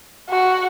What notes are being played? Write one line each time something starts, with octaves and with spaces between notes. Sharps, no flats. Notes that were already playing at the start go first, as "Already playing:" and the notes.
F#4